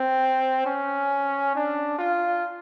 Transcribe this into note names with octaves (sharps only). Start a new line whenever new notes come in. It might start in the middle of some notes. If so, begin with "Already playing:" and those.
Already playing: C4
C#4
D4
F4